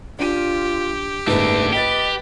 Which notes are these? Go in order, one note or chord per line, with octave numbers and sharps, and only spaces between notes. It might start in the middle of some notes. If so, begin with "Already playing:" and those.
D4 F4 G4 D7 D#7
F#1 G#2 A3 D4 B4
G4 B4 D#5 A6 B6